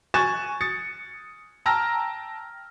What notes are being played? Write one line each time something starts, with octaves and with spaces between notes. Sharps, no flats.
G#5 C#6 F#6 G#6 A6 E7
D#6 A6 C#7
G5 A5 A#5 E6 F6 A#6